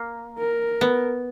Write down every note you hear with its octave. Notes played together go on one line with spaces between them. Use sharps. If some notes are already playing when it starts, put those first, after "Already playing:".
Already playing: A#3
A#4
B3